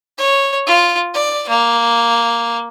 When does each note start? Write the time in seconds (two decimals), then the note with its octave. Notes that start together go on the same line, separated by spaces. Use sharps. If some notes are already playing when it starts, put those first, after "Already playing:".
0.18 C#5
0.66 F4
1.14 D5
1.48 A#3